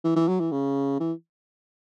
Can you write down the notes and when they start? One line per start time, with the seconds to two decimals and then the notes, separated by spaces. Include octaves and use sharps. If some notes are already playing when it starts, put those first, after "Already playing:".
0.04 E3
0.16 E3
0.28 F#3
0.40 E3
0.52 C#3
1.00 E3